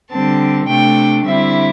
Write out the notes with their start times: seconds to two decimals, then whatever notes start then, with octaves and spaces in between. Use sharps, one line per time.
0.11 D3 G3 C4 A5
0.68 C3 A3 D4 G5
1.25 D3 G3 C4 E4 E5